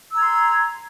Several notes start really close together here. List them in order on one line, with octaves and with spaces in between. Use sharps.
E6 A#5 G#6 C6